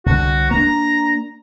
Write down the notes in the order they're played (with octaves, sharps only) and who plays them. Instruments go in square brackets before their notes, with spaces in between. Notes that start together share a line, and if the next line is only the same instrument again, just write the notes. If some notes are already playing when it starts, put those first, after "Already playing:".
[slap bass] C2 D3 [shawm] F#4
[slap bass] A#3 D4 [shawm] A#5